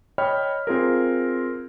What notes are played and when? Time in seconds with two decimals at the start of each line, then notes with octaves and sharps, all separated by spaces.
0.18 C#5 D#5 G5 B5 F6
0.67 C4 F4 G#4 A#4